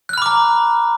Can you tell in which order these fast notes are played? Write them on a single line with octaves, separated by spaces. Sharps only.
F#6 F6 B5 D6 A#5